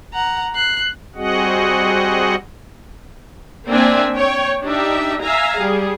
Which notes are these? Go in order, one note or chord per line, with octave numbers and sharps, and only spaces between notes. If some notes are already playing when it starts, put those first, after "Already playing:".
F#5 A#5
F#6 C7
G3 C4 F#4 G#4 D#5 F#5
A#3 C4 D4 E5 G#5
C#5 G5
D4 D#4 G4 E5
E5 F5 G#5 A#5
G3 G#4